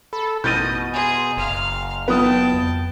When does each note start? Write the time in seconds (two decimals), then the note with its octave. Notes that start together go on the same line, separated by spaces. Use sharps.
0.13 A4 B5
0.44 A1 F2 B2 D#5 G6 A6 D#7
0.93 G#4 G#5 A#5 C6
1.37 F#1 F5 F6
2.08 F#3 B3 F4 G5 A5 D#6
2.53 F2